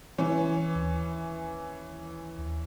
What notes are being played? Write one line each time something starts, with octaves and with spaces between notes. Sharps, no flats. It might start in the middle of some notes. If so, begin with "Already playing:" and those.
E3 C#4
D#2